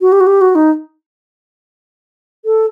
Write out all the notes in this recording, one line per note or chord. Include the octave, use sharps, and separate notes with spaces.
F#4
G4
F#4
G4
F#4
D#4
A4